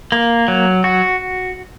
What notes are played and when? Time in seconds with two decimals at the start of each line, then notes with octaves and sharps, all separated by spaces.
0.12 A#3
0.48 F#3
0.84 F#4